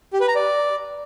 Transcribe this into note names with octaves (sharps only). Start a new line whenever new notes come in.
G4
B4
A#5
D5